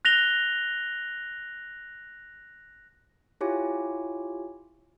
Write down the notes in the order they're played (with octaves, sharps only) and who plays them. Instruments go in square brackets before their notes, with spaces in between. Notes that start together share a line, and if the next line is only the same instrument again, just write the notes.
[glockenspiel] F#6 A#6 F7 G7
[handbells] E4 F4 G4 C#5 G#5